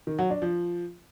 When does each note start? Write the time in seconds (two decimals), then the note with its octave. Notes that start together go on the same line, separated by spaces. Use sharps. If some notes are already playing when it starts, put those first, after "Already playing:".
0.07 D#3
0.19 F#3
0.30 D4
0.42 F3